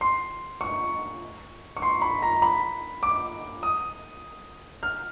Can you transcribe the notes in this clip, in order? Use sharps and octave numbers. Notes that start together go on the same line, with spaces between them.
C6
C#6
C#6
C6
B5
A#5
B5
D6
D#6
F6